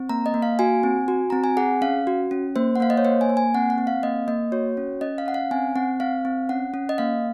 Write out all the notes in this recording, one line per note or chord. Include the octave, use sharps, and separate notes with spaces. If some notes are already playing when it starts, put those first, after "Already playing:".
Already playing: C4
A#3 A#5
D#5
A#3
F5
F#4 G#5
C4
F#4
C4 A#5
G#5
G#4 F#5
C#4 F5
F#4
C#4
A#3 C5
F#5
A#3 F5
D#5
C#5
A#3 C5
G#5
A#3
G#5
C4 F#5
F#5
C4
F5
A#3 D#5
A#3 D#5
F#4 C#5
C#4
C#4 D#5
F5
C#4 F#5
F5
C4 G#5
C4 F#5
C4 F5
C4
C#4 F#5
C#4
D#5
A#3 F5